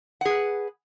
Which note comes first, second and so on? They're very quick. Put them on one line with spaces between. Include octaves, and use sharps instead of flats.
F#5 G#4 B4